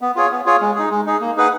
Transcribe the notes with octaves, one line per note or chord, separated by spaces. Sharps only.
B3
F4 G#4 C#5
B3
F4 G#4 C#5
G#3
D#4 G#4
G#3
D#4 G#4
A#3
D#4 G#4 B4 F#5